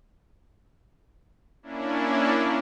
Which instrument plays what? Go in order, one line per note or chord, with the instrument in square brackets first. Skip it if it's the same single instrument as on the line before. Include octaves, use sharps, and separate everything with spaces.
[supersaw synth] A#3 C#4 D4 E4